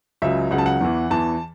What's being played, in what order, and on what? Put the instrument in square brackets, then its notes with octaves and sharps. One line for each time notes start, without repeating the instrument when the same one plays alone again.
[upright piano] C#2 C#3 F#3 E5
C#2 C#3 F#3 F#5
A5
F#5
E2 E3
E2 E3 A5